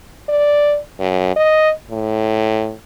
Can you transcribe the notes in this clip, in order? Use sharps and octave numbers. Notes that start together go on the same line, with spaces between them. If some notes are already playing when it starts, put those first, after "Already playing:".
D5
F#2
D#5
A2